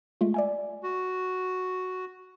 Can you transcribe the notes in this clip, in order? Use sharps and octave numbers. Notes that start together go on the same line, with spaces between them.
G#3 A3 F4
D5 E5 G#5
F#4